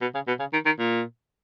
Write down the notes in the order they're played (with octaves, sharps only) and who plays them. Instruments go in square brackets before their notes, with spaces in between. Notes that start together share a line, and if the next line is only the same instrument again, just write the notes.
[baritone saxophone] B2
C#3
B2
C#3
D#3
D#3
A#2